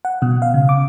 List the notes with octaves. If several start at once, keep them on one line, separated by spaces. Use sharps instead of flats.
F#5
B2
F5
C#3
D6